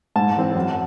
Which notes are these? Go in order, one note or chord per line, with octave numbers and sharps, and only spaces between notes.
G#2 A5
E3 C4
F#2